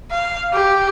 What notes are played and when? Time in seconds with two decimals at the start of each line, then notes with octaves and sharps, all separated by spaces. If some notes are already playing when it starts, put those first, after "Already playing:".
0.11 F5
0.53 G4